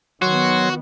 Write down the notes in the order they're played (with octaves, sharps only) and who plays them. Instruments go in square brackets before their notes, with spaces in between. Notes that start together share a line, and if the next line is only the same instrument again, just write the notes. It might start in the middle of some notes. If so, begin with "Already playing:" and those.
[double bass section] D#3 B3 [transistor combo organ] F#3 C#5 C6 [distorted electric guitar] F#4